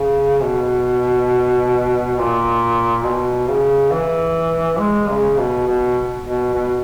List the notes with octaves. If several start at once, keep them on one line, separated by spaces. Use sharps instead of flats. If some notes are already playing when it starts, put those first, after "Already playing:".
Already playing: C#3
B2
A#2
B2
C#3
E3
G#3
C#3
B2
B2
B2
B2